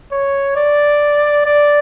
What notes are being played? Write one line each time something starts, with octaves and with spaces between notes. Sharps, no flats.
C#5
D5
D5